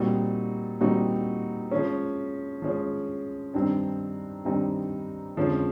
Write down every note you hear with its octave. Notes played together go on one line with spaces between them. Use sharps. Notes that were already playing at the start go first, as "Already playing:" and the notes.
Already playing: A#2 G3 C4 D#4 F#4
A#2 G3 C4 D#4 F#4
F3 G#3 C#4
F3 G#3 C#4
G2 D#3 G3 C4 D#4
G2 D#3 G3 C4 D#4
F2 D3 F3 G#3 C#4